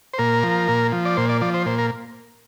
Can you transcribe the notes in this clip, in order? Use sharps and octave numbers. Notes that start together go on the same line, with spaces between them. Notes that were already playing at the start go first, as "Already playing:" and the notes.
C5
A#2 A#4
F3
A#2
F3
D5
A#2 C5
D5
F3 D5
C5
A#2 C5
A#4